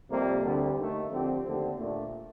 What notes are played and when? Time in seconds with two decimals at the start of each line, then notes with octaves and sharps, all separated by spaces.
0.10 F2 C3 G3 A#3
0.44 D2 D3 G3 C4
0.76 D#2 D#3 A3
1.11 D3 F3 C4 G4
1.44 D#2 D3 A3 C4
1.77 A#2 A3 D4